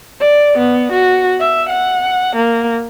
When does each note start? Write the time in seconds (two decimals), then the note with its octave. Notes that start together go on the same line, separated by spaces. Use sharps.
0.20 D5
0.58 B3
0.92 F#4
1.40 E5
1.69 F#5
2.36 A#3